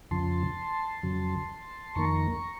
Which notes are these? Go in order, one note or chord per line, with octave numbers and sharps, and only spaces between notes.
F2 C#3 F3 A5 C6
F2 C#3 F#3
F2 D#3 A#3 A#5 C#6